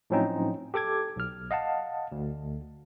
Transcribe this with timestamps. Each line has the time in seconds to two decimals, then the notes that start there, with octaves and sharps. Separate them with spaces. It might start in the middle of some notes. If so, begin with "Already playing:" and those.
0.10 A2 F3 F#3 C4 C#4 D#4
0.74 G4 A4 D6 G#6
1.16 B1 F6
1.51 D#5 F5 F#5 A5
2.12 D2